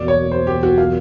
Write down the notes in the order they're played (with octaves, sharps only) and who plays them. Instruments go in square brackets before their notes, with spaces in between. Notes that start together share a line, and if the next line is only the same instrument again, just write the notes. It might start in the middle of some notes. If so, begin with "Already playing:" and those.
Already playing: [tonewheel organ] E2 B2 F#3 A#3 [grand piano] D5
[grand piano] C#5
C5
G4
F#4
F4